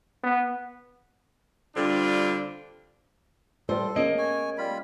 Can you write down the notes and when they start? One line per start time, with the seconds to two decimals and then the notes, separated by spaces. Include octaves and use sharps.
0.23 B3
1.76 D3 G3 C4 D4 F4
3.69 A2 G3 A3 A4 C5
3.96 A#3 B3 C#4 G#4 D#5
4.18 C#5 G#5
4.58 G3 F4 B5